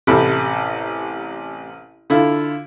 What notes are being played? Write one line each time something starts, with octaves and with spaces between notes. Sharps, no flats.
A1 C3 A4 B5
D3 E4 F4